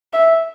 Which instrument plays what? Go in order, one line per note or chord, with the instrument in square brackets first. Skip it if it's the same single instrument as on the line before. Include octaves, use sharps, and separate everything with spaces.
[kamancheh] E5